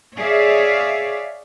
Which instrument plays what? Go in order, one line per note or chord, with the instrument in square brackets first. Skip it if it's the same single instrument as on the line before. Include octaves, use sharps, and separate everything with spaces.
[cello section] G#4 C#5 D5 E5 F5